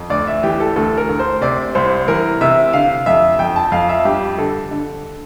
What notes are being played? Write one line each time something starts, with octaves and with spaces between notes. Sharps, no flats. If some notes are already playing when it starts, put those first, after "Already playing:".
Already playing: F2
D2 D5
E5
E3 G4
A4
D2 A4
A#4
D2
C5
C3 D5
C2 C5
E3 A#4
C3 E5
D3 F5
F2 E5
F2 G5
A5
F2 F5
E5
G2 G4
D3 A4
D3